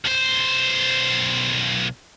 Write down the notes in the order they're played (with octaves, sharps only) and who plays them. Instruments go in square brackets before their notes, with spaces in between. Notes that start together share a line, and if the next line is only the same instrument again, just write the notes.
[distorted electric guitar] B1 C5